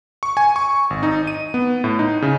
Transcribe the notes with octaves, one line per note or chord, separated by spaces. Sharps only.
C#6
G#5
C#6
G#1
D#4
D#7
B3
A2
D#4
C#3